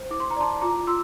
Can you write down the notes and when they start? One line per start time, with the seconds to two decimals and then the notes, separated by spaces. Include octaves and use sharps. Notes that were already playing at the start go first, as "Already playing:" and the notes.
Already playing: C5
0.11 E4 D6
0.20 C6
0.31 A#5
0.36 D5 A5 C6
0.61 F4 A#5 D6
0.87 F4 C6 E6